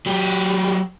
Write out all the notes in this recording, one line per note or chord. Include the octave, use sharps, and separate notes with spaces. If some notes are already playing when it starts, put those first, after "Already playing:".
F#3 G4